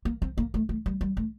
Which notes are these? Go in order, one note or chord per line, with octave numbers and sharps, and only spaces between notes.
A#3
C4
A#3
A3
A3
G3
G3
A3